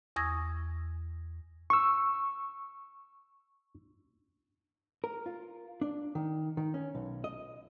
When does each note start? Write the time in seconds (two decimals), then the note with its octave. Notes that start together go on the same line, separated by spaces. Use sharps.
0.16 E2 C#6 D#6 E6 G#6 A#6
1.70 C#6 E6
5.04 A#4
5.26 F4
5.81 D4
6.15 D#3
6.57 D#3
6.74 C#4
6.95 B1
7.24 D#5